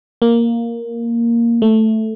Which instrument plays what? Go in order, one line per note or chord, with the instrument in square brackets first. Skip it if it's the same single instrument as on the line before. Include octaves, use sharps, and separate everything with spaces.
[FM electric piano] A#3
A3